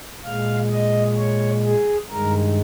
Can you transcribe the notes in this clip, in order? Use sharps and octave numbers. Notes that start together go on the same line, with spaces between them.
A#2 G#3 F5
D#5
C#5
G#4
G2 D#3 G#3 A#4